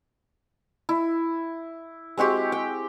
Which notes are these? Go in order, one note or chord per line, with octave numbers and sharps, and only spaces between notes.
E4
G#3 C4 F#4 G4
G5